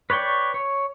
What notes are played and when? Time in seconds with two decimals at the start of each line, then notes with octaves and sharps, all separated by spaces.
0.10 B4 C#5 D5 G5 C#6
0.54 C#5